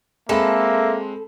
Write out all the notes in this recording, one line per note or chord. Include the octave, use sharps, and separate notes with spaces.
G#3 A#3 C4 A4 E5 B5